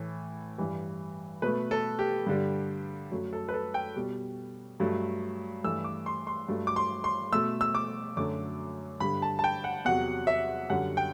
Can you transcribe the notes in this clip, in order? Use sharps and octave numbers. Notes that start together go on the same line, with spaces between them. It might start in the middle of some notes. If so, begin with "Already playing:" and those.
Already playing: A2 E3 A3
G2 E3 G3
B2 A3 B4
A4
G4
G2 D3 G3
F#2 F#3 A3
A4
B4
A4
G5
B2 G3
G2 F#3 A3
G2 E3 A3 E6
D6
C6
C6
G2 F#3 A3
D6
C6
C6
B2 A3 E6
E6
D6
F#2 D3 F#3 A3 D6
G2 D3 G3 B5
A5
A5
G5
F#5
E2 C3 F#3 F#5
E5
F#2 D3 G3 F#5
G5